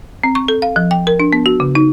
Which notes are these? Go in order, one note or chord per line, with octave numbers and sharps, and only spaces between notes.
C4
C#6
A4
F5
F3
G5
A#4
D4
B3
F#4
C#3
D#4